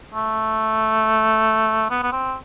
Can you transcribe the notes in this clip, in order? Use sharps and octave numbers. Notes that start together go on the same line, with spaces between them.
A3
B3
B3
C4